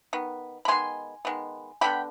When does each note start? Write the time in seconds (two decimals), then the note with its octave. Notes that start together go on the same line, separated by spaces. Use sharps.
0.13 D#3 B3
0.65 B5
0.68 D#3 G#3 B3 G#5 C6
1.25 D#3 G#3 B3
1.81 D3 F3 B3 G5 B5